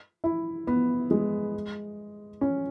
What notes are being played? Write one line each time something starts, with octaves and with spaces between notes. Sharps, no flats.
E4
B3
G#3
C#4